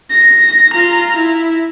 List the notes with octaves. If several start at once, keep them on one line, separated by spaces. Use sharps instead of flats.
A#6
F4 A#5
E4